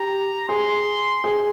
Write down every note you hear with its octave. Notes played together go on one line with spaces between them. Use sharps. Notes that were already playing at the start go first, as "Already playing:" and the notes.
Already playing: G4 A#5
G#4 C6
G#4